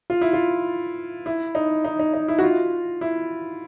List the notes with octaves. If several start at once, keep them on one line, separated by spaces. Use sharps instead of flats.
F4
E4
F4
E4
D#4
D#4
D#4
D#4
E4
F#4
F4
E4